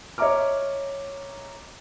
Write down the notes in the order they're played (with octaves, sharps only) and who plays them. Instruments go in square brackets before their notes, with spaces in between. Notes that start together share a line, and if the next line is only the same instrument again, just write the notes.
[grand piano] C#5 D#5 E5 A#5 D6 F6